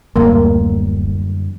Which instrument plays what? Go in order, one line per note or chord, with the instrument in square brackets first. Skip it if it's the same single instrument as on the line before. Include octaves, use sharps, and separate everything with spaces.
[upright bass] D1 F#3 [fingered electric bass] F#2 D3 G3 [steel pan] A#3